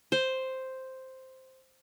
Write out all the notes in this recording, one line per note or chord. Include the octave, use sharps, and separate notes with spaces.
C5